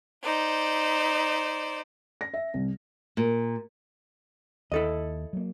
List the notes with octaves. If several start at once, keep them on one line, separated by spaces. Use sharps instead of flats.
D#4 C5 D5
A#6
E5
C2
A#2
D#2 E4 A4 D#5
F#3 A#3